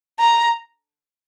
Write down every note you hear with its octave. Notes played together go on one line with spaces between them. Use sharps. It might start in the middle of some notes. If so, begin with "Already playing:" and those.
A#5